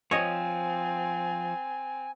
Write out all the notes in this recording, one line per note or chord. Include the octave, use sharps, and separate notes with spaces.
F3 C4 C#5 D#5 G#5